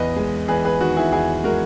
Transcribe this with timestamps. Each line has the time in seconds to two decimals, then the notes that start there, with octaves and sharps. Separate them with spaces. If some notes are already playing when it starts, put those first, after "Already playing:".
Already playing: E2 B4 D#5
0.16 G#3
0.48 E2 G#4 B4
0.65 G#4 B4
0.81 D#3 F#4
0.97 E4 G#4
1.12 E2 E4 G#4
1.44 G#3 F#4 A#4